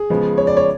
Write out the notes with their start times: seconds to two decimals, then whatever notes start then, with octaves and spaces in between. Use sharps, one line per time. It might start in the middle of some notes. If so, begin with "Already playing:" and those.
Already playing: G#4
0.10 C#3 F3 G#3 B3
0.38 C#5
0.47 D5
0.57 C#5